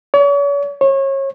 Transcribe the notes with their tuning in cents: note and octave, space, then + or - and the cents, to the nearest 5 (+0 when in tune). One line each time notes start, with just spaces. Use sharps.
C#5 +40
C#5 -30